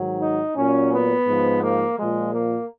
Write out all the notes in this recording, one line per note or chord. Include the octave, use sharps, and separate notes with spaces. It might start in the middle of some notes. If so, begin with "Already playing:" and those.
Already playing: G#2 D#3 F#3
D#4
A#2 F#3 C#4
B3
G#2 F3
A#3
A#2 F3 G#3
A#3